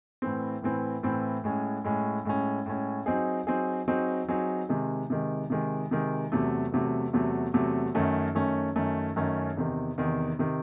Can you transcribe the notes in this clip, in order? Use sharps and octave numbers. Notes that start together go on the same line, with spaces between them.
A2 E3 C4
A2 E3 C4
A2 E3 C4
A2 G#3 C#4
A2 G#3 C#4
A2 G#3 C#4
A2 G#3 C#4
F#3 C4 D#4 G#4
F#3 C4 D#4 G#4
F#3 C4 D#4 G#4
F#3 C4 D#4 G#4
C3 D#3 G#3
C3 D#3 G#3
C3 D#3 G#3
C3 D#3 G#3
E2 C3 F#3 A3
E2 C3 F#3 A3
E2 C3 F#3 A3
E2 C3 F#3 A3
F#2 D#3 A3 C#4
F#2 D#3 A3 C#4
F#2 D#3 A3 C#4
F#2 D#3 A3 C#4
E2 C3 D#3
E2 C3 D#3
C3 D#3